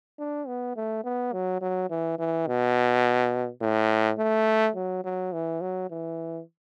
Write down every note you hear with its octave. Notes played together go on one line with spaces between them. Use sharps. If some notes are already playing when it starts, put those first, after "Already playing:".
D4
B3
A3
B3
F#3
F#3
E3
E3
B2
A2
A3
F#3
F#3
E3
F#3
E3